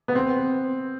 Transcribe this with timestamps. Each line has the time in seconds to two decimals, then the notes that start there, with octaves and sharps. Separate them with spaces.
0.08 B3
0.15 C4